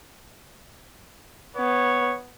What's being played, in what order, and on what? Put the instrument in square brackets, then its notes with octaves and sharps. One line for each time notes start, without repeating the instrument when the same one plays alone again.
[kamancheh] B3 [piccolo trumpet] C#5